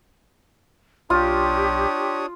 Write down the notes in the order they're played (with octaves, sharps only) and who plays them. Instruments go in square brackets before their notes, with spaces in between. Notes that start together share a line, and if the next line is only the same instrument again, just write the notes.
[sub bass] B1 [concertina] D4 C#5 D#6 [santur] F4 [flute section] G4